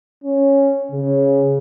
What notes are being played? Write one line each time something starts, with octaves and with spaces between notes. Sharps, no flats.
C#4
C#3